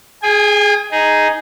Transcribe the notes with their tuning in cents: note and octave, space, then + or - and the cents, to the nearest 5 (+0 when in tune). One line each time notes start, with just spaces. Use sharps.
G#4 +10 G#5 -40
D#4 +0 G#4 +0